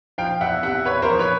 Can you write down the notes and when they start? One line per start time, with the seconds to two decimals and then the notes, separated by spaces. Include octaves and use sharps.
0.18 F3 F5 G5
0.41 E2 E5 F#5
0.63 C3 E5 F#5
0.85 E2 B4 C#5
1.02 A#4 C5
1.09 F3
1.19 B4 C#5